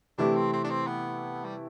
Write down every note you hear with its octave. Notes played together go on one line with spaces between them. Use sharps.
C3 E3 A3 D4 E4 G4
C4
C4
D4
C4
B3
G3